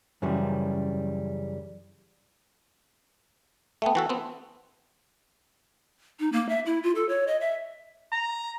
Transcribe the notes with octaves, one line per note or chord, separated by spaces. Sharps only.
F#2 C#3 E3 G3
A3 B3 E5 G5 A5
E3 F#4 A4
B3 C4
D#4
A#3
E5
E4
F4
A4
C#5
D#5
E5
A#5